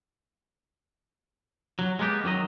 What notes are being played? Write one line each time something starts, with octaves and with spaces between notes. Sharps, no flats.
F#3
G#3 A#3 B3 G4
F#2 D#3 F#3 D#5